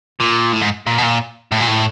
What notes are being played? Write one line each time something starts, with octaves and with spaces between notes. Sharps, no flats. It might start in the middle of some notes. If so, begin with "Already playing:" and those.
A#2
A2
G#2
A#2
B2
A#2
A2
A#2
A2